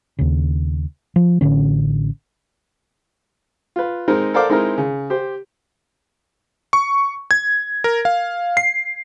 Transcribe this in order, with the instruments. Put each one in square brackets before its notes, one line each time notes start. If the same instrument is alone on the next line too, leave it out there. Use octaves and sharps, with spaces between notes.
[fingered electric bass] D#2 C#3
F3
A1 D3 C#4
[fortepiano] F4 B4
G#3 C4 D#4 A#4
A4 A#4 C5 D5 F5 D6
G#3 C4 D#4 E4 A#4
C#3
G4 C5
[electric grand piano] C#6
G#6
A#4
F5
C7